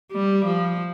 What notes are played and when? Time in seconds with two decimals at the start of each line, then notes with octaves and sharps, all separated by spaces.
0.12 G3
0.45 F3